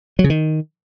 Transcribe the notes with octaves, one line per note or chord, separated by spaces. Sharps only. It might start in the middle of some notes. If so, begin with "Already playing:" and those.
F#3
C#3
D#3